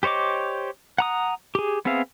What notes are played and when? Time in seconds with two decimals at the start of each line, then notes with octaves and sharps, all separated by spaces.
0.03 G4 C5 C#5 D#5 D6
0.98 F#5 A#5 D#6
1.55 G4 G#4
1.85 B3 C4 G#4 E5 F5